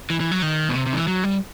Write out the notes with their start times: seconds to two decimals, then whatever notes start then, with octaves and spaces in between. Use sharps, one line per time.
0.10 E3
0.20 E3
0.32 F#3
0.42 D#3
0.69 B2
0.75 C3
0.86 C3
0.93 D#3
0.97 E3
1.07 F#3
1.24 G3